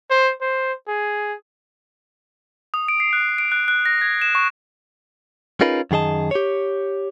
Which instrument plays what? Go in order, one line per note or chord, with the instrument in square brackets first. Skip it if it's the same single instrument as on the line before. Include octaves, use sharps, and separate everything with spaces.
[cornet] C5
C5
G#4
[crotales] D#6
D7
C7
F#6
D7
F#6
F#6
A#6
G#6
E7
C#6
[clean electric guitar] C#4 D#4 F4 G#4 A#4 B4
F#2 D#3 G#4 D#5 A5
G4 C#5